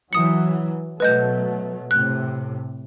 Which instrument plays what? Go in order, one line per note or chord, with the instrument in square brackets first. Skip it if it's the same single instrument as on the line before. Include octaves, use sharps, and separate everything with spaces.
[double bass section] E3 F#3 [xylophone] D#6 C#7
[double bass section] B2 F#3 A3 [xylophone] B4 D#5 G6
[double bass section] A2 C3 [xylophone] F#6